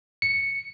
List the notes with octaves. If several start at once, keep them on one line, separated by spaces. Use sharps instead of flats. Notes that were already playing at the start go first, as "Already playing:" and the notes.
C#7